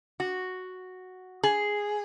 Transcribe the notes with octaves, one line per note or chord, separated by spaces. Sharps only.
F#4
G#4